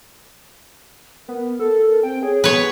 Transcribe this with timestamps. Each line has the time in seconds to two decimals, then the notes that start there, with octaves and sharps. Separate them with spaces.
1.29 B3 A#4
1.60 A4
2.03 C4 G5
2.23 G#4 C#5
2.44 B3 B4 C#5